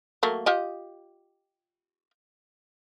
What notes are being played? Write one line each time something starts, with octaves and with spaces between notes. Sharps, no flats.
F#3 A3 A#3
F4 G4 D#5